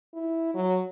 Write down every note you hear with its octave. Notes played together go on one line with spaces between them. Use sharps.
E4
F#3